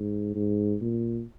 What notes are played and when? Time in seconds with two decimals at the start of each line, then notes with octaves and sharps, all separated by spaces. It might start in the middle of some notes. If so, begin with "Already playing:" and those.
Already playing: G#2
0.35 G#2
0.81 A#2